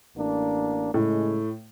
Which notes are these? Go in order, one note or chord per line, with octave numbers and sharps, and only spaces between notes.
A1 A#3 D4
A2 C#3 G#3